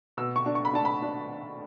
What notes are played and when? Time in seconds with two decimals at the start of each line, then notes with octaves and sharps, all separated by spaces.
0.17 B2 E6
0.36 C#6
0.46 D4
0.55 C#6
0.65 B5
0.73 D4 A5
0.85 B5
1.02 D4